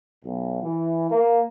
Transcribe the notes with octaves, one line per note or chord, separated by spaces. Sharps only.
B1
E3
A#3